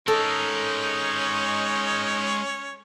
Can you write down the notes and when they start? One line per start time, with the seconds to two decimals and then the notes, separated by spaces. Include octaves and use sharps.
0.08 G#3 C#4 D#4 A4 A#4 C#5